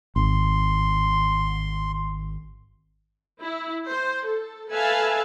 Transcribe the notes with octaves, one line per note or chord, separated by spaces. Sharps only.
G#1 C6
E4
C5
A4
A4 B4 E5 F5 G#5 A5